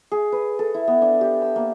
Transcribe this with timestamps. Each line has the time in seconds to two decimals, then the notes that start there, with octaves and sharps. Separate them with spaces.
0.12 G#4
0.32 B4
0.59 A4
0.74 E4
0.87 B3
1.02 D4
1.21 G4
1.42 E6
1.56 A#3